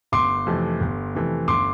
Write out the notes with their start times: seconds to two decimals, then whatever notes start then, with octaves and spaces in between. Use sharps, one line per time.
0.12 G1 C6 D6
0.46 F2 C3 E3 A3
0.81 G1
1.15 F2 C3 E3 A3
1.48 G1 C6 D6